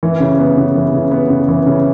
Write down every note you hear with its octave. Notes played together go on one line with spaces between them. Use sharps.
E3
C#3
B3
C#3
E3
C#3
B3
C#3
E3
C#3